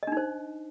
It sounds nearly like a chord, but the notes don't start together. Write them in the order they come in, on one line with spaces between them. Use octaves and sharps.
D#5 D4 D#4 C5